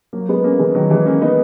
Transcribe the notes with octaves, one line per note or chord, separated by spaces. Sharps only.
F#3 A#3
G#3 B3
A#3 C#4
E3 G#3
D#3 F#3
E3 G#3
A#3 C#4
B3 D#4